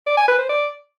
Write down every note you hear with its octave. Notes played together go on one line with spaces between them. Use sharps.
D5
G#5
B4
C5
D5